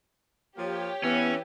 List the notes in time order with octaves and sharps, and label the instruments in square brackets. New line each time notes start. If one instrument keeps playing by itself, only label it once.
[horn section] F3 A#3 [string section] G4 C#5
[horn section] E3 [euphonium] B3 [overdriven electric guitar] C#4